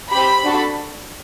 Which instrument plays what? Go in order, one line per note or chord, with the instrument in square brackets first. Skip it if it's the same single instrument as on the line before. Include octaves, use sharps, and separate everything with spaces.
[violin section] C4 G4 B5
D4 F#4 A4